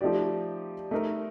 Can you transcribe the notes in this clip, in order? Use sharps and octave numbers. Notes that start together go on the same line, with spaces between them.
F3 A3 D#4 G4 D5
A3 D#4 A#4